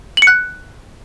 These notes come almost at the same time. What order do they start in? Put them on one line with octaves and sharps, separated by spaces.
F#7 C#7 F#6